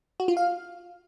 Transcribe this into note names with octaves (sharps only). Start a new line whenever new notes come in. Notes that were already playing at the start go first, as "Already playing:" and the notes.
F#4
F4
F5